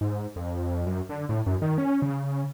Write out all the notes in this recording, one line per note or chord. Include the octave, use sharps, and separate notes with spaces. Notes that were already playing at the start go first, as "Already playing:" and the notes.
G#2
F2
F#2
D3
A2
F#2
D#3
C#4
C#3